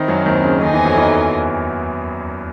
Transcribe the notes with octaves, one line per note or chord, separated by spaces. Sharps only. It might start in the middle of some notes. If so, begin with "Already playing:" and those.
Already playing: D#3 C4 D#4 E4 C5
F#2 F#3
D#2 D#3
C#3
D#2 D#3 D#4 A4 C5 D#5 G#5
E2 E3
F#2 F#3
E2 E3